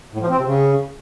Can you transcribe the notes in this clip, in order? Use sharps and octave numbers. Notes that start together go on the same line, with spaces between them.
A2
F3
C4
C3
C#3